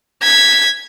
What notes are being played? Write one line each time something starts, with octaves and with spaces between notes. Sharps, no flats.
G#6 B6